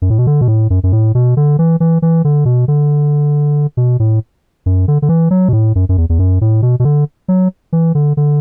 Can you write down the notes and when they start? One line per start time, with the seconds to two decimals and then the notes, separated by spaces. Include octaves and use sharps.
0.02 F#2
0.10 A2
0.18 B2
0.27 D3
0.41 B2
0.48 A2
0.70 F#2
0.83 F#2
0.92 A2
1.15 B2
1.37 D3
1.59 E3
1.80 E3
2.02 E3
2.24 D3
2.45 B2
2.68 D3
3.77 B2
4.00 A2
4.66 F#2
4.88 D3
5.02 D3
5.09 E3
5.31 F#3
5.48 B2
5.53 A2
5.75 F#2
5.89 F#2
5.98 E2
6.09 E2
6.19 F#2
6.41 A2
6.62 B2
6.80 B2
6.85 D3
7.28 F#3
7.73 E3
7.95 D3
8.17 D3